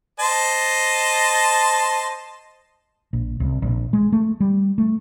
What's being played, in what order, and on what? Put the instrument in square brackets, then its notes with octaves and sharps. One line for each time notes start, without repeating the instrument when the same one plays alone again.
[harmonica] C5 D#5 A5
[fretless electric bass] A#1
C2
A#1
G#3
A3
G3
A3